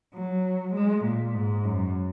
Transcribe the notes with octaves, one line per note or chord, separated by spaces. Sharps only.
F#3
G#3
A#2
G#2
F#2